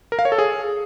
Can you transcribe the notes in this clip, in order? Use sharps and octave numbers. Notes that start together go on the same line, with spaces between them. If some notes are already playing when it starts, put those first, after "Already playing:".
A#4
F5
C#5
A4
G#4